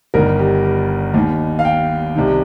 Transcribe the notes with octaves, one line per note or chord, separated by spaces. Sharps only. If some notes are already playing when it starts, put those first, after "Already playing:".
G1 G2 D#3 A#4
G4
G4
D#2 D#3
F5
G5
C2 C3 D#3